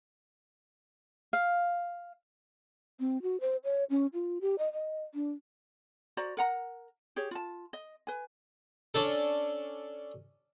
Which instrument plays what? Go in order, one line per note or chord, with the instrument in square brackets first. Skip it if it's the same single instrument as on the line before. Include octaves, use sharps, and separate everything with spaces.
[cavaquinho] F5
[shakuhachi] C4
F#4
C5
C#5
C#4
F4
G4
D#5
D#5
D4
[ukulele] F#4 C5 D5 A#5
A#4 F#5 A#5
G4 G#4 C#5
F4 A5
D#5
B4 G#5
[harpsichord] C#4 D4 A4